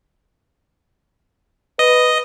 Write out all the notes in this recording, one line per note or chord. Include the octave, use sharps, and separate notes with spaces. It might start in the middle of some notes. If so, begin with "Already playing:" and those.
B4 D#5